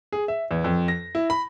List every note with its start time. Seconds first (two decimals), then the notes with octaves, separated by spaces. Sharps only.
0.12 G#4
0.28 E5
0.51 E2
0.64 F2
0.88 A#6
1.15 E4
1.30 B5